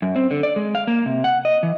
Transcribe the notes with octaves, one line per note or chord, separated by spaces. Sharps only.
F#2
C4
D3
D5
G#3
F5
A#3
C3
F#5
D#5
E3